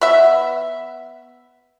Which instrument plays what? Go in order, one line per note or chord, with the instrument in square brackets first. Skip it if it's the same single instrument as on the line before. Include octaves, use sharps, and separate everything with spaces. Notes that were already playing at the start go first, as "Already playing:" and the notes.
[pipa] B3 E5